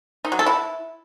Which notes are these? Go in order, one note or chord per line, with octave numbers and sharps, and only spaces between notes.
D#4
F#3
A4
E4